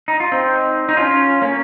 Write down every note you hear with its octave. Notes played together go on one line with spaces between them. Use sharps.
D#4
F4
C4 D#4
D#4
C#4 F4
A#3 C#4